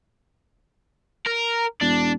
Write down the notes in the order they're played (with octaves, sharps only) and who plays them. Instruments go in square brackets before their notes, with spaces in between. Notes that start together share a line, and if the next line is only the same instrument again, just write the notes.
[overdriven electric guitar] A#4
[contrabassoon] E1 [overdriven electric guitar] D4